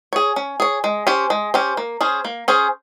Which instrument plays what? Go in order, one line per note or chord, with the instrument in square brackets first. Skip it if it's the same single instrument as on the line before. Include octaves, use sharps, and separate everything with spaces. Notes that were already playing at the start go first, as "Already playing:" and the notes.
[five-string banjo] G#4 C#5
C#4
G#4 C#5
G#3
C#4 G4 C5
G#3
C#4 G4 C5
A#3
C#4 G#4 C5
A#3
C#4 G#4 C5